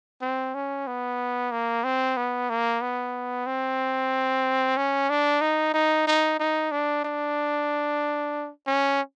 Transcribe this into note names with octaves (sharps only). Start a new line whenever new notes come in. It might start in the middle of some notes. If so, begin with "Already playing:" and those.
C4
C#4
B3
A#3
C4
B3
A#3
B3
C4
C#4
D4
D#4
D#4
D#4
D#4
D4
D4
C#4